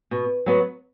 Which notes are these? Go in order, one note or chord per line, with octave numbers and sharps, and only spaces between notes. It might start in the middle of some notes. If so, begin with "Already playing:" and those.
B2
F#3 B3